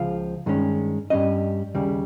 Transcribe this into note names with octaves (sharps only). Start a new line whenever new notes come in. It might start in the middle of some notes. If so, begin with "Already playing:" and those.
Already playing: C#2 C#3 F3 F5
G2 D#3 G#3 C#4
G2 G3 C#4 D#5
D#2 C#3 G3